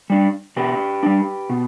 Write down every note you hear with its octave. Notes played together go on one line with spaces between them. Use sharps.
G3 D4
B2 G4 B4
G3 D4
B2